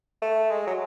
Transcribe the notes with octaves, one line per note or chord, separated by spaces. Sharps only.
A3
G#3
F#3